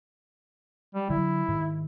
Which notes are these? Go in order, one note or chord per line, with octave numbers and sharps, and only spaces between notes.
G3
D3 F#3 E4
G#2 D#3